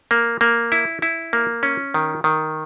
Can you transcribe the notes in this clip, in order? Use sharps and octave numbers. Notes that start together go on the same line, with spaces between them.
A#3
A#3
E4
E4
A#3
C#4
D#3
D#3